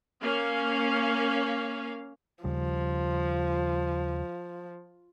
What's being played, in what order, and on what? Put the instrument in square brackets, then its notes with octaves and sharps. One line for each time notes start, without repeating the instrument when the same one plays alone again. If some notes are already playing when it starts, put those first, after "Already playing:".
[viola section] A#3 C#4 F5
[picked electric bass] D#2 C#3 G3 [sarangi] F3